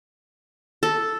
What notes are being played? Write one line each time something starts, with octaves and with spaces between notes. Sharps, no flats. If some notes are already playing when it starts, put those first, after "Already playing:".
A4